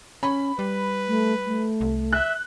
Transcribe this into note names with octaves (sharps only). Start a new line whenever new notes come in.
C#4 B5
G3 B4
A3
A3
C2
E5 F#6